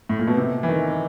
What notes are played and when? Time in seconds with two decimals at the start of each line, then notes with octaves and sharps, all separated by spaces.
0.09 A2
0.19 A#2
0.27 B2
0.37 C3
0.63 E3
0.69 D#3